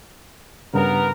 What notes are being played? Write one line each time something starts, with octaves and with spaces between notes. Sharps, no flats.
G2 C#3 B3 A#4